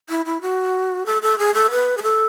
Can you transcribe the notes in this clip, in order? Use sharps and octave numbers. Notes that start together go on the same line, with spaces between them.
E4
E4
F#4
A4
A4
G#4
A4
B4
G#4
A4